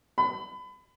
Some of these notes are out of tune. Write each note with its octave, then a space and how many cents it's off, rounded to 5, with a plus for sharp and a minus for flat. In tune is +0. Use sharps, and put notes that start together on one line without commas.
B5 +30